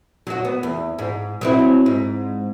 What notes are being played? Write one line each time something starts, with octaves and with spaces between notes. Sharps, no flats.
F#3 F#4
B3
E2
G#2
F#3 C4 E4
G#2